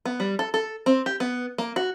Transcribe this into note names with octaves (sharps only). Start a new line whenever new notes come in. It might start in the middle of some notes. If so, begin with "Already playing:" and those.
B3
G3
A4
A4
C4
G4
B3
A#3
F#4